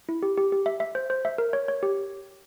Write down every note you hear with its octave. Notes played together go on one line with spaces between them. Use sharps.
E4
G4
G4
G4
E5
E5
C5
C5
E5
A#4
C#5
C#5
G4